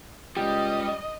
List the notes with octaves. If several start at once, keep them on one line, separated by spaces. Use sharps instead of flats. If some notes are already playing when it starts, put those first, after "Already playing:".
C#2 G3 G4 D#5